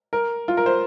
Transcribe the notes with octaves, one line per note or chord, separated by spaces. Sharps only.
A#4
F4
A#4
C5